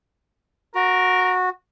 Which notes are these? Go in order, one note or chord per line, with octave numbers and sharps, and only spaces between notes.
F#4 A#4